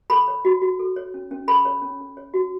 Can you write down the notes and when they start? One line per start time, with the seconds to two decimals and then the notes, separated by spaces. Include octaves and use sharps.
0.10 A4 B5
0.28 C#5
0.45 F#4
0.62 F#4
0.79 A4
0.96 C#5
1.14 C#4
1.31 C#4
1.48 A4 B5
1.65 C#5
1.82 C#4
2.00 C#4
2.17 C#5
2.34 F#4